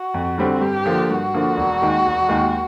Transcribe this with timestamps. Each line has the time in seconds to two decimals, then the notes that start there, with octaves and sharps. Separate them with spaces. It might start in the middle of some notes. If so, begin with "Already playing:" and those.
Already playing: F#4
0.14 F2
0.38 D3 G3 C4
0.61 G2 G4
0.85 D3 F3 A#3 D4
1.10 G2 F#4
1.34 D3 F3 A#3 D4
1.57 E1
1.82 D#2 D#3 G#3
2.05 E1
2.28 D#2 D#3 G#3